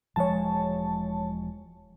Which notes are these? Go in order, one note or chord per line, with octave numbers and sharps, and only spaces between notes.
E1 F3 G#3 C#5 A5